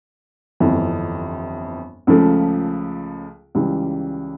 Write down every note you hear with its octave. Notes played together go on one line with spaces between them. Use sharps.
G1 F2 E3
C#2 C#3 F3 A3
C#2 C#3 E3 G3